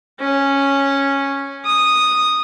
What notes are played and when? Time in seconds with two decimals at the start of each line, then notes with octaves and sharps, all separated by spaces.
0.20 C#4
1.65 D#6